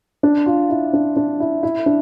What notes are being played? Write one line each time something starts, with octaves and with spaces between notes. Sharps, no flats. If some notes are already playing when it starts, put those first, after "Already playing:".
D4
F4
E4
D4
D4
E4
E4
D4